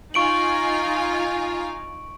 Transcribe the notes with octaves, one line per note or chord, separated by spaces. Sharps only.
D#4 F4 G#5 C#6 D7 F#7